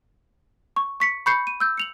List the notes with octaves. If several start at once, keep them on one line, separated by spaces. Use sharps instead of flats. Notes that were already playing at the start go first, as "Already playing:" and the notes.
C#6
C#6 B6 C#7
B5 C#6 G6 C7 C#7
D#7
E6 G6
C#7 F7 F#7